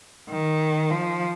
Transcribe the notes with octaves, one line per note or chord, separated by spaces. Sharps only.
D#3
F3